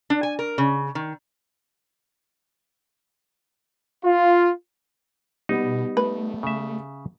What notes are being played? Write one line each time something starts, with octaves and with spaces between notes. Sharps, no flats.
D4
G#5
A#4
C#3
D#3
F4
B2 G3 B3 D#4
A3 B4
C#3 E5